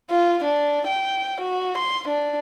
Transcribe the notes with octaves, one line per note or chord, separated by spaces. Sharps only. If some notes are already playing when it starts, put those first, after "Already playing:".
F4
D4
G5
F#4
C6
D4